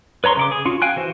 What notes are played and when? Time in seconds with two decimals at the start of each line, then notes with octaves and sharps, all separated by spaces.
0.24 B4 C#5 A#5 C6 C#6
0.37 C#3 D5 D6
0.52 G#4
0.65 C#4 F4 F#4
0.82 F5 G5 G#5 F#6
0.96 E3 F#4 C5